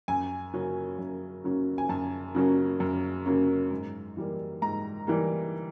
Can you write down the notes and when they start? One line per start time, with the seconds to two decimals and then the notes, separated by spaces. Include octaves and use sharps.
0.08 F#2 G#5
0.53 C#3 F#3 A#3 C#4
0.99 F#2
1.44 C#3 F#3 A#3 C#4
1.78 G#5
1.89 F#2 A5
2.35 C#3 F#3 A#3 C#4
2.80 F#2
3.26 C#3 F#3 A#3 C#4
3.71 G#2
4.17 E3 G3 A#3
4.62 G#2 A#5
5.07 E3 G3 A#3